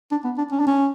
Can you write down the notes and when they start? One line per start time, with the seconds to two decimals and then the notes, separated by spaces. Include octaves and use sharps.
0.11 D4
0.24 B3
0.38 D4
0.52 C#4
0.60 D4
0.67 C#4